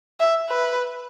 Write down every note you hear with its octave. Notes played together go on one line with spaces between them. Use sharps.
E5
B4